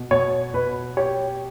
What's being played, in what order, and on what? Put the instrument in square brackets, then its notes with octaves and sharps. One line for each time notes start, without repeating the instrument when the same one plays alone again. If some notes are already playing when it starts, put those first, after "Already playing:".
Already playing: [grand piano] B2
[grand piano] B2 [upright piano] C#5
[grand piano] B2 [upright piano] B4
[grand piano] G4 [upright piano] C#5